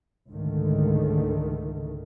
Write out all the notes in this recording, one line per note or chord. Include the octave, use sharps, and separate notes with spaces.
C#2 G#2 D3 D#3 A3